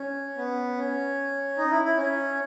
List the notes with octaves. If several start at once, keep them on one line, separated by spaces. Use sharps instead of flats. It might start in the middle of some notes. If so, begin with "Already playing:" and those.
Already playing: C#4
B3
C#4
D#4
E4
E4
C#4